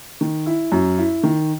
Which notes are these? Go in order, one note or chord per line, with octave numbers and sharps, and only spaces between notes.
D#3
E4
F#2
E4
D#3